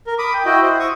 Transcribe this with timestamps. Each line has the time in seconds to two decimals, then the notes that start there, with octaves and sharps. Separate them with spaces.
0.07 A#4
0.19 B5 D6 D#6
0.34 G5
0.46 E4 F#4 D#5 G5
0.62 E4 C5
0.79 C#6 D#6